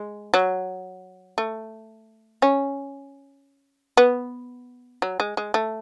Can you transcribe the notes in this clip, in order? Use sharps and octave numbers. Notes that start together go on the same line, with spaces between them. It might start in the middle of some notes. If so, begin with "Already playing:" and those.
Already playing: G#3
F#3
A3
C#4
B3
F#3
G#3
G#3
A3